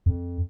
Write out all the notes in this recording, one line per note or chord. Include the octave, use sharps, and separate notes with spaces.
F2